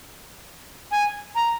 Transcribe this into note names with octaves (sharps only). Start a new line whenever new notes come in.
G#5
A#5